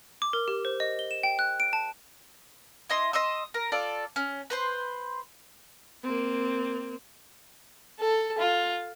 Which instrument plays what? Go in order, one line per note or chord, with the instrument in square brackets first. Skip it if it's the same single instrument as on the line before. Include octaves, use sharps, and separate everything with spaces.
[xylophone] D6
A#4
G4
C5
D#5
G7
E7
G5
F#6
D7
A5
[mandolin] E4 D#5 C6
D#5 C6 D#6 E6
A#4
F4 A4 D5
C#4
B4 C5 C6
[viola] A#3 C4
[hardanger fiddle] A4
F4